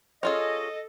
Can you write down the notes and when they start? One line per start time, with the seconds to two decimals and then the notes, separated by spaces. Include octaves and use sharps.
0.23 C#4 F4 G#4 A4 D#5